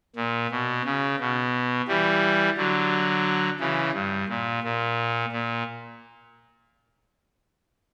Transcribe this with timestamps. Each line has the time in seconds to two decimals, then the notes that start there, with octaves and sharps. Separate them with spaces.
0.16 A#2
0.51 B2
0.85 C#3
1.20 B2
1.88 E3 G3
2.57 D3 F#3
3.60 C#3 E3
3.94 G2
4.29 A#2
4.63 A#2
5.32 A#2